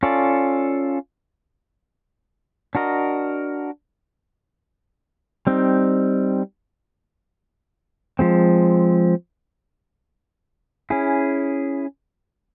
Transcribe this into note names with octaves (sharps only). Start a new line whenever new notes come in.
C#4 F4 A4 D5
D4 F#4 A#4 D#5
G3 C4 D#4
F3 G#3 C4
C#4 E4 G#4